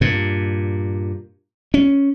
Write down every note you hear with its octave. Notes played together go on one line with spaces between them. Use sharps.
G2 A#2
C#4